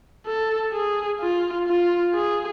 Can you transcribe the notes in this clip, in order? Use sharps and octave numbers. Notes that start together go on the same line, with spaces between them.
A4
G#4
F4
F4
G#4